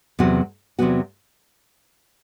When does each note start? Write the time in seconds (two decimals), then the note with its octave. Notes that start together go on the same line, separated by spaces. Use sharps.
0.19 E2 C3 F#3 B3 F#4
0.79 E2 C3 F#3 B3 F#4